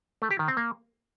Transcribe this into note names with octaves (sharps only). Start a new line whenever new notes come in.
A3
G4
D#3
C4
A#3